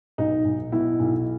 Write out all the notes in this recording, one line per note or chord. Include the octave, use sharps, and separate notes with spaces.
B1 D#4
B1
B2 E4
B1